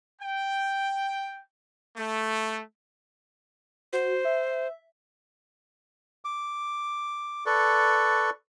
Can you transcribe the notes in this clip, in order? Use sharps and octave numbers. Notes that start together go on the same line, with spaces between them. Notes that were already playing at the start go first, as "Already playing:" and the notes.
G5
A3
F#4 C5
E5
D6
A4 B4 D5 C#6